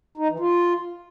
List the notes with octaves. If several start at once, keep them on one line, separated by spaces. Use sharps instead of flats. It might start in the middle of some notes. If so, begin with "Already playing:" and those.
D#4
E3
F4